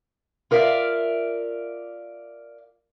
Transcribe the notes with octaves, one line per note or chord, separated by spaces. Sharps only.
F4 A#4 D5 E5 F5